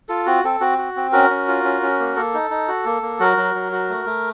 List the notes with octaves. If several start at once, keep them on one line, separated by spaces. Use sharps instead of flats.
F4 A4
C4 F#4
C4 A4
C4 F#4
F#4
C4
C#4 F#4 A#4
C#4
F4
C#4
C#4
A#3
A#3 A4
D#4
D#4
F#4
A#3
A#3
F#3 F#4 A#4
F#3
F#3
F#4
A3
A3